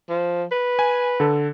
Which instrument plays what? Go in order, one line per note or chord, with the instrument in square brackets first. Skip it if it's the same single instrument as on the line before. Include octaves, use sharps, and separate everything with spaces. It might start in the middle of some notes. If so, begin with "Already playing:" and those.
[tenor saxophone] F3
B4
[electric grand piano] G#5
D3 A4